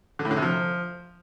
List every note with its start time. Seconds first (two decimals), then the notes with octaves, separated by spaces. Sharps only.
0.19 D3
0.25 A2
0.31 D3
0.37 C3
0.42 F3